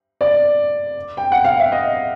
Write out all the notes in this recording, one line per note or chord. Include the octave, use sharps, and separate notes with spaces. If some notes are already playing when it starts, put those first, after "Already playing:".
D5
G5
F#5
F5
E5
D#5